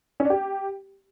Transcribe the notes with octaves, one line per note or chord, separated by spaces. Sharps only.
C#4
D4
G4